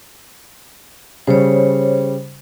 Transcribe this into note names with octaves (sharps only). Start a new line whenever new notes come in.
C#3 G3 C5 C#5